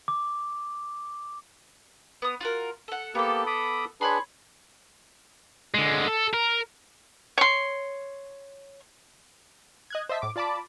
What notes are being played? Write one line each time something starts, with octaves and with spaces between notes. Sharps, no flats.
D6
B3 D#6
F4 F#4 A#4
A4 F#5
A#3 B3 G4 A4
B5 D6 D#6
D4 G#4 B4 C#5 B5 C6
D3 G#3
A4
A#4
C#5 C6
D#5 F#6 G#6
C5 D#5 E5 A5 B6
A2 D6
F4 D5 A5 B5 D6